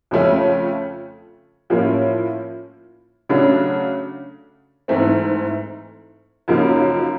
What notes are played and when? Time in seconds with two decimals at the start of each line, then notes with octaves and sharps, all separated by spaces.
0.11 F2 C#3 F3 A3 C#4
1.70 A2 F3 A#3 C#4
3.29 C#3 F#3 A3 D4
4.88 G#2 E3 A3 C4
6.48 F#2 C#3 F3 A#3 D#4